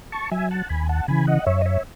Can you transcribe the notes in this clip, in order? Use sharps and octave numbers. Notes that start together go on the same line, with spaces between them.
A5 C#6
F#3 E5 G#5
F#5 A5
D#2 G#5 B5
F#5 A5
C#3 E3 G#5 B5
D#5 F#5
F#2 C#5 E5
D#5
C#5 E5